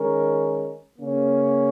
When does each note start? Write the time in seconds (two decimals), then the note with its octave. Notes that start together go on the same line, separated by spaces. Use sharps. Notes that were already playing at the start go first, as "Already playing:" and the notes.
Already playing: D#3 G#3 C#4 A#4
0.97 C#3 A#3 C#4